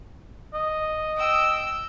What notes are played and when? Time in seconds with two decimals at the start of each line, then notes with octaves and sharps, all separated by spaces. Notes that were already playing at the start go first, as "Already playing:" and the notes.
0.54 D#5
1.17 G5 E6